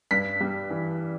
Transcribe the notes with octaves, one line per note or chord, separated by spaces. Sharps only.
G2 B6
G3
E3